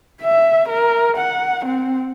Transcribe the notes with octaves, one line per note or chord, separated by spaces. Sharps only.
E5
A#4
F#5
C4